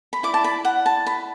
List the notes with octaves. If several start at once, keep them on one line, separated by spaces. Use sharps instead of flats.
B5
E4 D5 D6
A5
B5
F#5
A5
B5